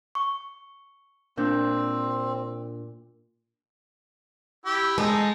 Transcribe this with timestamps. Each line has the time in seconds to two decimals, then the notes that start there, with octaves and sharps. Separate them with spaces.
0.15 C#6
1.37 A#2 C4 D4 G6
4.65 E4 G4
4.98 G#3 D#4 A4